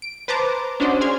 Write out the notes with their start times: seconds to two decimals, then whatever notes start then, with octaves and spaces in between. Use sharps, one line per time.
0.02 D7
0.28 B4 C5 A5 A#5 D6
0.80 C#4 D4 F#4 C5 D5 D#5
1.01 G#4 C6 F6 G#6